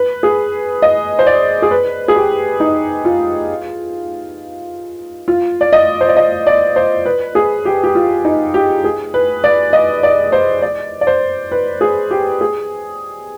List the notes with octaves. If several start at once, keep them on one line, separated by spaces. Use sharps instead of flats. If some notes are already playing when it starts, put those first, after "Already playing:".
Already playing: B4
G#4
D#5
C5
D5
G#4
B4
G#4
G4
D#4
F4
F4
D5
D#5
C5
D5
D#5
D5
C5
B4
G#4
G4
G4
F4
D#4
G4
G#4
B4
D5
D#5
D5
C5
D5
D5
C5
B4
G#4
G4
G#4